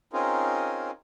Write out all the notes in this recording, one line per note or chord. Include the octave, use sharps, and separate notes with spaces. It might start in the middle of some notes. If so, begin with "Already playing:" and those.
C4 C#4 D#4 F4 G#4 A#4